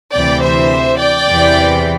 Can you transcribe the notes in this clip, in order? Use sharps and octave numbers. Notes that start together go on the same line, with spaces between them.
D2 C3 E3 D5 G5
C5 E5
D5 G5
E2 C3 E3